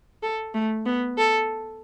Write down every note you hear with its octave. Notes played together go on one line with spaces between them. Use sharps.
A4
A3
B3
A4